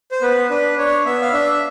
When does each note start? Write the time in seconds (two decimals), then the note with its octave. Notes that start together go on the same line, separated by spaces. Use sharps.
0.11 C5
0.22 B3 B4
0.50 D4 B4
0.78 D4 C#5
1.05 B3 E5
1.21 F5
1.33 D4 E5